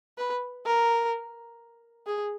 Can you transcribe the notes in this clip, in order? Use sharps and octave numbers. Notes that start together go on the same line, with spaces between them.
B4
A#4
G#4